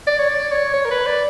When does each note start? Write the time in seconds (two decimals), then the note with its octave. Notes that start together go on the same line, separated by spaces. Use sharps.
0.07 D5
0.19 C#5
0.29 D5
0.51 C#5
0.73 C#5
0.85 A#4
0.90 B4
1.06 D5